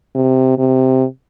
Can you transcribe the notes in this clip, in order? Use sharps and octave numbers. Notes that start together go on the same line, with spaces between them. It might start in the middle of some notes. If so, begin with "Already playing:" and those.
C3
C3